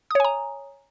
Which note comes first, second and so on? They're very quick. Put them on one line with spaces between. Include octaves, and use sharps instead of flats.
D#6 C#5 G#5 A#5